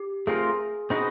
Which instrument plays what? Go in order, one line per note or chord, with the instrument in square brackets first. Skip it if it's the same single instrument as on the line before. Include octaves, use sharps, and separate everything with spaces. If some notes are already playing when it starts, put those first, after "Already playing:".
Already playing: [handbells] G4
[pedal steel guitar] A3 C4 F4 A#4 [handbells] G#4
[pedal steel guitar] C4 D#4 F#4 B4 D#5 [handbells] G#4